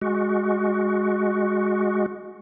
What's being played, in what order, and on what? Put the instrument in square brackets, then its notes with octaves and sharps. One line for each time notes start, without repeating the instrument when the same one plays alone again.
[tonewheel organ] G#3 F#4